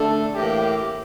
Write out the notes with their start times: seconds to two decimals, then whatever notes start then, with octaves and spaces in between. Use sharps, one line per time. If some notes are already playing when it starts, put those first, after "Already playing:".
Already playing: D3 A3 D4 A4
0.35 A2 E3 A#3 G4